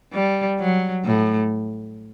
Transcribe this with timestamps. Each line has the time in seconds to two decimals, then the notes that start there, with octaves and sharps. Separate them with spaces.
0.13 G3
0.60 F#3
1.05 A2